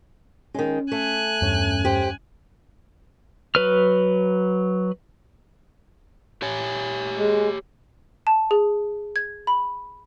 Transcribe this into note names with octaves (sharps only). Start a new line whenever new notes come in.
D#3 G#3 C#4
A3 G#5 F#6
E2 G2 C#4
G4 C5
F#3 B4 F6
G4 C#5 G#5
G#3
A5
G#4
G#6
B5